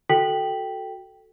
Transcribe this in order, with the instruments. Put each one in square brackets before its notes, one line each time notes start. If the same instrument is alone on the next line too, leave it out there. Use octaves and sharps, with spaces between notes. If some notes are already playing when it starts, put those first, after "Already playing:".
[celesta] F#4 A4 G5 B6 F#7